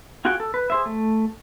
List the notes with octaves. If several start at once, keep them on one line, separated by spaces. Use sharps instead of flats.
F4 F#4 G#4 F#5 G5
A4
B4
G#4 C5 E5
A3